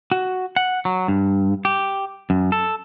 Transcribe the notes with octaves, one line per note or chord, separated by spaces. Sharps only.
F#4
F#5
F#3
G2
G4
F#2
A4